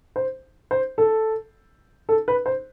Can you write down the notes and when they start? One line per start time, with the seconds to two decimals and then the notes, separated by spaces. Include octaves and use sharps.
0.16 C5
0.71 C5
0.98 A4
2.09 A4
2.28 B4
2.46 C5